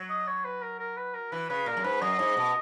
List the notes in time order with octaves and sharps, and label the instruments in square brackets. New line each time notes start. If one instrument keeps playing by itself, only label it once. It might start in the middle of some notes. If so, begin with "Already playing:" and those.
Already playing: [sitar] F#3
[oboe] D#5
C#5
B4
A#4
A#4
B4
A#4
[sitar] E3 [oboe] B4
[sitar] C#3 [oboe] B4
[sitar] A#2 [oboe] A#4
[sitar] F#2
[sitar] G#2 [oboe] B4
[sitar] F#2 [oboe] D#5
[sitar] G#2
B2